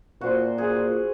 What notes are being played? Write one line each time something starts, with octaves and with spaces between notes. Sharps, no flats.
A#2 F#4 C5
G#4